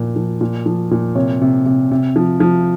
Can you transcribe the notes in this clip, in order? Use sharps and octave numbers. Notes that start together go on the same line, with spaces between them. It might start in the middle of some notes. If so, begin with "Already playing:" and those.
Already playing: A#2 F3
F3
A#2
F3
A#2
C3 C#5
C3
C3
C3
F3
F3